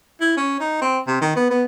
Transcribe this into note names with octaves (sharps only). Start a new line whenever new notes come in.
E4
C#4
D#4
C4
C3
D#3
B3
B3